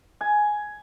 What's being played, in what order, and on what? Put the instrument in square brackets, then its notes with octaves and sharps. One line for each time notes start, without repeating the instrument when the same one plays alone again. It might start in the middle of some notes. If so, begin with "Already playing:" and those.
[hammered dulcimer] G#5